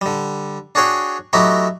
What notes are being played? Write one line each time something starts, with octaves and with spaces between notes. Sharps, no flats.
D3 G3
D4 F#4 G#4 C#5 G5
F#3 A3 D#4 E4 F#4 G4